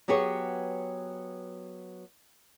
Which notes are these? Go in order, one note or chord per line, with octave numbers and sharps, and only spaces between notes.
F#3 B3 G4 G#4 C#5